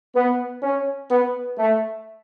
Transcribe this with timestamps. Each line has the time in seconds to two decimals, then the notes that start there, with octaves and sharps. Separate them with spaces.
0.15 B3
0.63 C#4
1.11 B3
1.58 A3